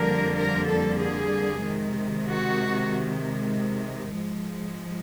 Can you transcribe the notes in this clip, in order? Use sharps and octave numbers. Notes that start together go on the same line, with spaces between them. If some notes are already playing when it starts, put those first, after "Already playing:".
Already playing: F2 D3 G3 A#3 A#4
A#4
A4
G#4
C3 D#3 G#3
F#4
G#2 F3 G#3